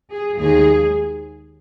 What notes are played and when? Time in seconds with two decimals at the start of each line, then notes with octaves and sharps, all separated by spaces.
0.11 G#4
0.39 D#2 D#3 G#3 G#4